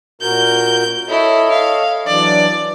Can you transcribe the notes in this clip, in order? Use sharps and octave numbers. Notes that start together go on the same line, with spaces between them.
A#2 F#4 A#4 G6
E4 A4 C#5 D#5
F5
E3 F#3 D4 D5